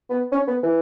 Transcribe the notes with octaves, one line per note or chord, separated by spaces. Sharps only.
B3
C#4
B3
E3